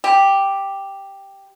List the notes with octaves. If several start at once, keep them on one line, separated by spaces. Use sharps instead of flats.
G4